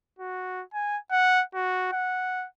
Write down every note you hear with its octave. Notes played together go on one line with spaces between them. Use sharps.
F#4
G#5
F#5
F#4
F#5